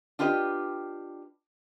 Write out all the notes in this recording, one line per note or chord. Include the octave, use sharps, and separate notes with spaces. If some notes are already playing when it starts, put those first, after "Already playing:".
D4 F4 G4 B4 D#5